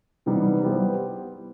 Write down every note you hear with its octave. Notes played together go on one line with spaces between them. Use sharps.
C3 E3 G3 B3 D#4
G3 B3 E4 G4 C5